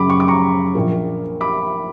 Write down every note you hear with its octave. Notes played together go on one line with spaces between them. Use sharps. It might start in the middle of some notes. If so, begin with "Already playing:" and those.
Already playing: F#2 C#3 F#3 B5 D6
C#6
D6
A#5 C#6
A#1 A#2 A#3
B5 D6